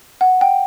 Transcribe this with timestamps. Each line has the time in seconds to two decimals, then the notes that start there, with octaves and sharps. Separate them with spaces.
0.21 F#5
0.41 G5